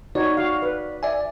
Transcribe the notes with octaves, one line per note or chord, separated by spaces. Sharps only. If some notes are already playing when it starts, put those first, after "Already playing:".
D#4 F#4 C#5 D5
F#4 F5
B4
D5 E5 G#5